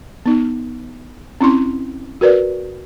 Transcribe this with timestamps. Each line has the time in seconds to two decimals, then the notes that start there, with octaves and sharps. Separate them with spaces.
0.26 B3 D#4
1.41 C4 C#4 E4 C6
2.21 F#4 A#4 B4 D5